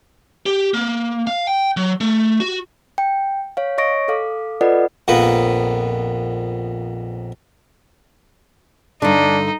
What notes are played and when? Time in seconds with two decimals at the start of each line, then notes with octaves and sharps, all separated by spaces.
0.46 G4
0.74 A#3
1.27 F5
1.47 G5
1.77 F#3
2.01 A3
2.40 F#4
2.98 G5
3.57 C#5 F5
3.78 C#5 D#5 C#6 A#6 D7
4.08 A4 F5 D6
4.61 F4 A4 B4 D5 D#5 F#5
5.08 A#1 F2 A#3 B3 B4
9.02 G2 D3 D4 D#4